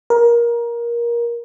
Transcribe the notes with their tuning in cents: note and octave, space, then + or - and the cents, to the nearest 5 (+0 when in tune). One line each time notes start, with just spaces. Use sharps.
A#4 +20